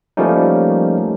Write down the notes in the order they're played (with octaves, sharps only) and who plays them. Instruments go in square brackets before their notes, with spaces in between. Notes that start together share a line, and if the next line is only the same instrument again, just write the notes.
[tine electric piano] F3 G3 A3 A#3 C#4 D#4